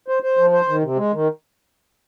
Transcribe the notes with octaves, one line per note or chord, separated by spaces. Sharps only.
C5
C5
F3
C5
D#3
C3
G#3
D#3